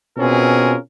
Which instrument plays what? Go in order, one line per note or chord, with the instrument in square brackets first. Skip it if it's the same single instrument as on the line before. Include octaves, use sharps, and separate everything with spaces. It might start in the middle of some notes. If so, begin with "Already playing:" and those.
[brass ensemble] B2 C4 C#4 F4 G#4 A#4